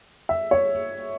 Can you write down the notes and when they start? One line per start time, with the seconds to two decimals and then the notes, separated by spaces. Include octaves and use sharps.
0.29 E5
0.51 C#5